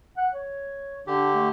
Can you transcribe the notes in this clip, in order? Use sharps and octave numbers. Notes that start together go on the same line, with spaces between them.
F#5
C#5
D3 D4 G4
A3